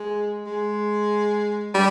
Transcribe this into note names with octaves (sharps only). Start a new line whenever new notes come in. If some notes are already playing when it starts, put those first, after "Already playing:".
Already playing: G#3
G#3
G3